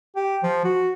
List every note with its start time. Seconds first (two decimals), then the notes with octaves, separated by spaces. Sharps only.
0.16 G4
0.43 F3
0.64 F#4